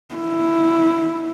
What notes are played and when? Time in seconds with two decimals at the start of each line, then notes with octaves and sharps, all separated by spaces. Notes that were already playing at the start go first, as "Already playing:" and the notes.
0.15 E4